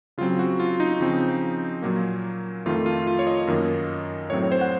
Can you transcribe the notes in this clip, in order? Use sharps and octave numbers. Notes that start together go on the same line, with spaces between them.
C#3 F#3 C4 F4
F#4
F4
D#4
C#3 F3 C4
A#2 F#3 A#3
F2 D#3 A3 F4
F4
F4
C#5
D#5
F#2 D#3 A#3
A2 F#3 C4 C#5
C#5
C5
F#5